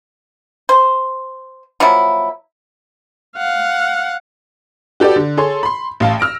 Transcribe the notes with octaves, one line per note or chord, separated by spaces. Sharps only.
C5
F3 F#3 A#3 E4
F5 F#5
F#4 G4 A4 B4 D5
D3
G#4 A4 C#5 C6
B5 C6
A1 F5 A5
E6 F6 A#6 D7